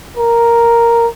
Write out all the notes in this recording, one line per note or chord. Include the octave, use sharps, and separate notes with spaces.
A#4